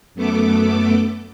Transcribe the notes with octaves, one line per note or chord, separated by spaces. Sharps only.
F#2 A3 B3 A4 D6